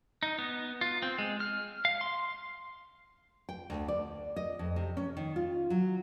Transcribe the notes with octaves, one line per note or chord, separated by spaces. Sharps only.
D#4
B3
F4
C4
G#3
F6
F5
C6
G5
D2
D5
D#5
F2
C3
C#4
D#3
F4
F#3